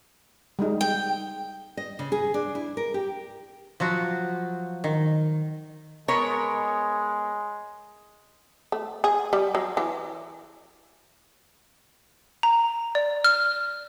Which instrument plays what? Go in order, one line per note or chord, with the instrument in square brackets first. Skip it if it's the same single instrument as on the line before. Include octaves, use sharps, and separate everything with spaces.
[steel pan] G3 G#3 D#4
[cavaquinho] G5
[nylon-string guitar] D#5
C#3
G#4
D4
E4
A#4
G4
[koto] F3 F#3 F#4
D#3
[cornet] G#3 [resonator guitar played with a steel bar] B3 A#4 C#5
[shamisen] A3
G#4
G3
F#3
E3
[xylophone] A#5
D5
F6